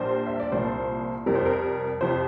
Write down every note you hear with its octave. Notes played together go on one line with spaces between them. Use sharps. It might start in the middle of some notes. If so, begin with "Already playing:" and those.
Already playing: A#1 A#2 G3 C5
E5
D5
C2 A#2 F3 C5
F2 C3 G3 A#4
C5
A#4
F2 C3 F3 C5